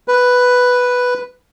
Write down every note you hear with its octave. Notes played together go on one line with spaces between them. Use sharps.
B4